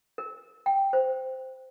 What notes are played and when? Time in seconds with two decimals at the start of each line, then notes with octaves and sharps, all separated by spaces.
0.18 A#4
0.66 G5
0.93 C5